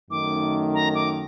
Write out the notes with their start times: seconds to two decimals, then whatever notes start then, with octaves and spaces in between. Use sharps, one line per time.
0.11 F#2 D#3 A3 D#4 D6
0.74 A#5
0.95 D6